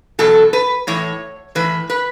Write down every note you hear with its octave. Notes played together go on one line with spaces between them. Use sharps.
E2 B2 F#3 A4
B4
A2 E3 C#5
A2 E3 B4
B4